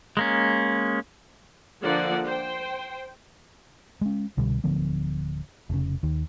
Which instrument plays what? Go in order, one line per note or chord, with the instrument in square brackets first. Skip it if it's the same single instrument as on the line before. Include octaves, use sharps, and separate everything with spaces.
[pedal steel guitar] G#3 A#3 C#4
[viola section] D3 F3 A#3 D5 F#5
C5 G5
[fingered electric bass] G#3 C#4
C2 B2 D3 G3
D1 D3 F3 B3
F1 C#3
D#2 D#3